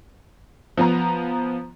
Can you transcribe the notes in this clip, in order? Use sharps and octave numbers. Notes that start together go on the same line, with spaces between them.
F3 B3 A#5